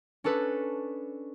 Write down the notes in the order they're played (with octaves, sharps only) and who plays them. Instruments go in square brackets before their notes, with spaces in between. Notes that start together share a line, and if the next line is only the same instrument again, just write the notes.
[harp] C#4 D4 A4 B4